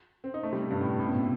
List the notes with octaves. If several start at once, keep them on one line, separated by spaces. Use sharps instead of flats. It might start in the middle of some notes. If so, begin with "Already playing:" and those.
C4
D#4
A3
G3
C3
G2
A2
A2
B2
C3